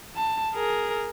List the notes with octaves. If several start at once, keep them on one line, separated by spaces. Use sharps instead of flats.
A5
G#4 A#4